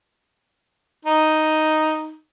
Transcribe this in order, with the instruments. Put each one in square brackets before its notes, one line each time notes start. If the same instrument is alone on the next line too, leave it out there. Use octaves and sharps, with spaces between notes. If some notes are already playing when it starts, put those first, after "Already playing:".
[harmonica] D#4